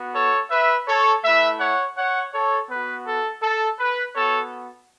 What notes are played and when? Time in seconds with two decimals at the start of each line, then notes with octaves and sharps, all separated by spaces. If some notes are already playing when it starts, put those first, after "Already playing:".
Already playing: B3 F#4
0.15 A4 C#5
0.51 B4 E5
0.87 A4 C#5
1.25 A3 E4 B4 E5
1.60 C#5 F#5
1.98 C#5 F#5
2.33 A4 C#5
2.70 B3 F#4 B4
3.07 A4
3.43 A4
3.80 B4
4.16 B3 F#4 A4 C#5